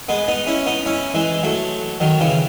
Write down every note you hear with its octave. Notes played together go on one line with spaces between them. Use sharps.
G#3 B3
B3 D#4
C#4 E4
B3 D#4
C#4 E4
E3 G#3
F#3 A3
D#3 F#3
C#3 E3